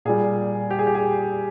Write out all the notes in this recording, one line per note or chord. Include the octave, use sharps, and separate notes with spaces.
A#2 G3 G#4
G4
G#4
G4
G#4